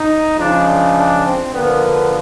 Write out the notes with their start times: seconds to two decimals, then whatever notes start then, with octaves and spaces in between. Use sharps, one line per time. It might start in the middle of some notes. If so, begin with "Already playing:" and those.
Already playing: D#4
0.37 C#3 F3 G#3 D4
0.66 D4
0.95 D4
1.24 C4
1.52 D3 F3 A#3 B3